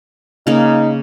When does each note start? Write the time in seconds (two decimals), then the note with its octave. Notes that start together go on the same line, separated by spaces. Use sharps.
0.47 C#3 A#3 D#4